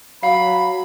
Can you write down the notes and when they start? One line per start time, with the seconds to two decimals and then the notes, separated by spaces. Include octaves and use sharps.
0.23 F#3 F5 B5